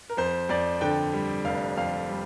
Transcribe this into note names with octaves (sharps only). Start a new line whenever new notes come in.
A#4
F2 C5
F2 D5
D3 G5
G3
F1 F5
F2 F5
G3